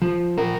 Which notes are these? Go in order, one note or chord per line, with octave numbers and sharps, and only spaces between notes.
F3
A#4